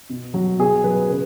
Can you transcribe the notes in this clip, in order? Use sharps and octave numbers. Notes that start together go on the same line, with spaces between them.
B2
F#3
B2 G#4
F#3 B4
C#3 B4